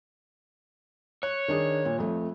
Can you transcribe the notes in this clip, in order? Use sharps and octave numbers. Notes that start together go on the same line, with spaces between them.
C#5 F#6
D#3 D4 G#4
A#2
F2 A3